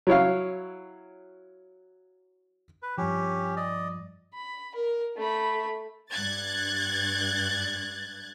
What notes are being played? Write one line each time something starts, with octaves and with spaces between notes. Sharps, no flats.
F#3 E4 C#5 F5
B4
G2 F3 C#4 G4
D5 D#5
B5
A#4
A3 B5
G2 F#6 G#6 A6